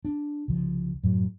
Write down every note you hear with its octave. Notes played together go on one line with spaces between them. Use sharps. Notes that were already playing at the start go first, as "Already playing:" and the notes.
D4
C2 C#3 F3
F#2 A2 F#3